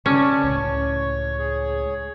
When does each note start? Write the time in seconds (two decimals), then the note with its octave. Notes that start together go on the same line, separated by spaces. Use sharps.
0.06 C#3 C#4 D5 A5 D6
0.44 C#2 A2 C#5 C#6
1.39 G#4 C#5